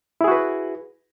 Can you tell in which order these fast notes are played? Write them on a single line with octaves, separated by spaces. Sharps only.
E4 G#4 F#4 B4